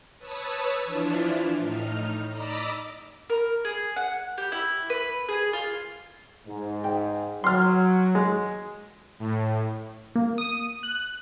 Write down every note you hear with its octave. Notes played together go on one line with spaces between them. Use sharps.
B4 C#5 A5 D#6 E6
E3 F3 D4 E4 F4
A2 D#4 F6
D5 D#5 A#5 B5 D6 E6
A#4
G#4
F#5
G4
E4
B4
G#4
F4
G#2
G5
F#3 C6 F6
G#3
A2
A#3
D#6
F#6